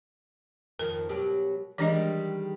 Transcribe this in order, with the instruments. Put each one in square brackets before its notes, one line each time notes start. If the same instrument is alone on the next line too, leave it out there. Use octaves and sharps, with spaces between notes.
[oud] F2 D#3 [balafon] A#4
[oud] B2 F#3 G4
[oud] D#3 G3 G#3 [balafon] E3 D4 D#5